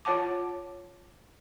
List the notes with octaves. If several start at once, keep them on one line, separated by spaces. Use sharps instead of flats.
F4 C#5 F#5 A5 D6